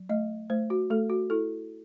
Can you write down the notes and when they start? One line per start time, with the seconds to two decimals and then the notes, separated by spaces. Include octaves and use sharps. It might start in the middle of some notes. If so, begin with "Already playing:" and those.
Already playing: F#3
0.09 A3 D#5
0.50 A3 C5
0.70 F#4
0.90 A3 A4
1.10 F#4
1.30 E4 A4